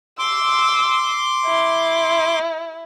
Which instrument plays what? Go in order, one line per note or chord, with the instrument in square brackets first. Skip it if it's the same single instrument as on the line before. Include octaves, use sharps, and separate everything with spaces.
[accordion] C6 D6 [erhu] E6
[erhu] E4